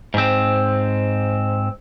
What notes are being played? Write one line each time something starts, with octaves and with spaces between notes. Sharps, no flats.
G#2 C4